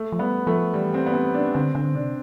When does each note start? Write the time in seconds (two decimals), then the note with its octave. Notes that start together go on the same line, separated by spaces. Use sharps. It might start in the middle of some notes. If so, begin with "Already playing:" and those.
Already playing: A3
0.12 F3
0.19 G3 B3
0.47 F3 A3
0.74 E3 G3
0.94 C4
1.06 B3
1.14 C4
1.34 D4
1.54 D3 C4
1.75 D3 C4
1.95 C3 D4